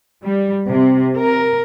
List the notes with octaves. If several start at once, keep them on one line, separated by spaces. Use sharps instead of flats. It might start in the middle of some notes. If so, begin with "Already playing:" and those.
G3
C3
A#4